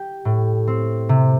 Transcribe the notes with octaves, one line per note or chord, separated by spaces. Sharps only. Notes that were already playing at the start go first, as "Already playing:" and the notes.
Already playing: G4
A2
C4
C3